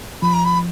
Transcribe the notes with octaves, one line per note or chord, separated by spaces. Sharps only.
F3 B5
A#5
B5